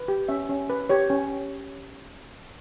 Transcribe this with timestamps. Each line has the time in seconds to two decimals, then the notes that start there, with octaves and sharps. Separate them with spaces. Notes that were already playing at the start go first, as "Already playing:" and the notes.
Already playing: B4
0.08 G4
0.28 C#4 E5
0.49 C#4
0.70 B4
0.89 G4 C#5
1.10 C#4